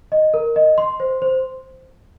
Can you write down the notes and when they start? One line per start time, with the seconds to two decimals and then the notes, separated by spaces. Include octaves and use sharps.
0.12 D#5
0.34 A#4
0.56 D#5
0.78 C6
1.00 C5
1.22 C5